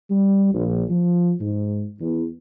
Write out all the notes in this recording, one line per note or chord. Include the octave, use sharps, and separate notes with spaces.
G3
A#1
F3
G#2
E2